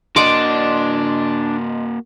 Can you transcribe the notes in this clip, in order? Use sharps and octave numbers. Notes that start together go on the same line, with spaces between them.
A#3 D4 F#4 D5 D#5 F#5 C6 D6